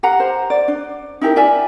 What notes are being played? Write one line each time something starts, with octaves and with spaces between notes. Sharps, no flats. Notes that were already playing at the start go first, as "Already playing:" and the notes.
G4 F5 F#5 A#5
C5
D5
D4
D#4 E4 G4 A#4
F4 D5 E5 G#5